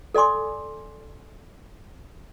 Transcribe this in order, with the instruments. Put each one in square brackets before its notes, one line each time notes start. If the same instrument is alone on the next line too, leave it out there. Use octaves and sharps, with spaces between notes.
[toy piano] A4 D5 G#5 C6 D6